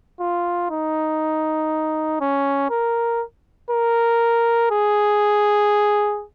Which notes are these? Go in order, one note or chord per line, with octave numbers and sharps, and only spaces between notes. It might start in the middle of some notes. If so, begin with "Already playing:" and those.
F4
D#4
C#4
A#4
A#4
G#4